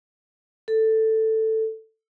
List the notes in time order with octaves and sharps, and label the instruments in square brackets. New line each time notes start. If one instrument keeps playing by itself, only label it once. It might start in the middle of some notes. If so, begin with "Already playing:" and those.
[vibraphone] A4